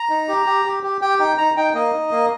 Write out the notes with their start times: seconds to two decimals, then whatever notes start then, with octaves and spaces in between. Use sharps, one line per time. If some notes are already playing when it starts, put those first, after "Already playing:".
Already playing: A#5
0.10 D#4
0.28 G4
0.46 G4
0.66 G4
0.83 G4
1.01 G4 G5
1.19 D#4 G5
1.38 D#4 A#5
1.56 D#4 G5
1.74 A#3 D#5
1.93 D#4
2.11 A#3